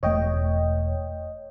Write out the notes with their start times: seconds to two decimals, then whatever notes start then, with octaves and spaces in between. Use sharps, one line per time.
0.03 E1 A3 C#5 D#5 G5